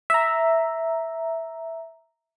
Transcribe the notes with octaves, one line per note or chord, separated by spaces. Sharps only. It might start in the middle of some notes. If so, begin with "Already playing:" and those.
E5 A#5